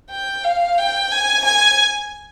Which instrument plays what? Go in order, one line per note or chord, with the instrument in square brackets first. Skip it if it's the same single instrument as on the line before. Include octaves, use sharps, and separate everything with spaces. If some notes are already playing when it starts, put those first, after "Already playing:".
[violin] G5
F5
G5
G#5
G#5